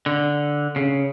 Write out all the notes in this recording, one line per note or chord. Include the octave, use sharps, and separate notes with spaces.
D3
C#3